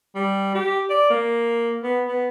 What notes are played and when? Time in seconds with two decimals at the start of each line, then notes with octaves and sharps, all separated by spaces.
0.16 G3
0.55 G4
0.90 D5
1.10 A#3
1.84 B3
2.08 B3